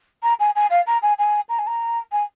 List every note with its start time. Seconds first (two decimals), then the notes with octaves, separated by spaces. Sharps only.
0.23 A#5
0.40 G#5
0.55 G#5
0.70 F5
0.87 A#5
1.02 G#5
1.19 G#5
1.49 A#5
1.59 G#5
1.67 A#5
2.12 G#5